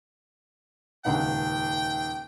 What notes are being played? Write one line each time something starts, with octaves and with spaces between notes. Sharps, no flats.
D#1 C#2 F#5 G5